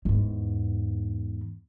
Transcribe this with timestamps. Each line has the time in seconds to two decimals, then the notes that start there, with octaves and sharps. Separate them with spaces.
0.05 E2 G#2